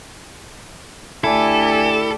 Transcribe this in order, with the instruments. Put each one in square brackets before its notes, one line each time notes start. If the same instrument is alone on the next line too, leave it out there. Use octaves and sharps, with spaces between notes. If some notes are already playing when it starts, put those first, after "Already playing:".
[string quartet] D2 D4 G4 [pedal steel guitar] E4 [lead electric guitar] A4 [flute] G#5